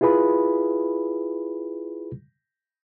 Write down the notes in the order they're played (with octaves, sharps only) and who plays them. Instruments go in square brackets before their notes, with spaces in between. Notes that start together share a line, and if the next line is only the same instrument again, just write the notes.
[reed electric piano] E4 F4 G#4 B4 B5